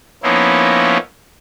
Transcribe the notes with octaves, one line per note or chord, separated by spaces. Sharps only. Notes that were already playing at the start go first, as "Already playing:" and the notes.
F3 A#3 B3 C#4 D#4 E4